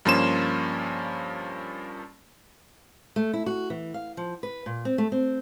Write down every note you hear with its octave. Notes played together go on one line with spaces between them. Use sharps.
G2 F3 A#3 C#4 C6 E7
A3
E4
F#4
E3
F5
F3
B4
A#2
C4
A3
C4